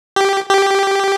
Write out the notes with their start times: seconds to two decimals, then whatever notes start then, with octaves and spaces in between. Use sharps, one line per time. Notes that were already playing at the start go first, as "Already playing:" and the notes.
0.16 G4
0.50 G4